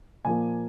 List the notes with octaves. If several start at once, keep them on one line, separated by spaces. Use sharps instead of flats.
A#2 F3 A#3 G#5